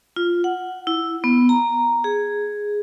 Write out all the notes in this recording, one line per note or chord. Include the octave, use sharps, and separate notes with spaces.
F4
F#5
E4
B3
A#5
G#4